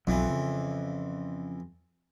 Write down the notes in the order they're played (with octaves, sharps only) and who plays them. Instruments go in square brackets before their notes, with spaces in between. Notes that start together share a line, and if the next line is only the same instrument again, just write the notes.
[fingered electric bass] B1 F#3 [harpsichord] F2 E3
[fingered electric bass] C#3